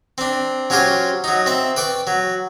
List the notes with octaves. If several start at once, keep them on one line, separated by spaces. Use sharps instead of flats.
C4 D4
F#3 C#4 F4 G4 C5 C#5
F#3 D#4
C4 E5
B4 D5 G5 C#6
F#3